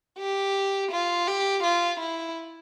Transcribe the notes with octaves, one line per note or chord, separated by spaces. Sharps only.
G4
F4
G4
F4
E4